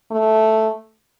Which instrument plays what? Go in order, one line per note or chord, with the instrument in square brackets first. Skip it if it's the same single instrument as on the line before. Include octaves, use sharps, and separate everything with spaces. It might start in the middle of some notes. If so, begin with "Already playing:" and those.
[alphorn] A3